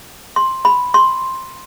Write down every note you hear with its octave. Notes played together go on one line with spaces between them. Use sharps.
C6
B5
C6